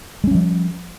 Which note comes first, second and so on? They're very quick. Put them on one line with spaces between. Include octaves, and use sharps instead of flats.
G#3 C#4 G3 F3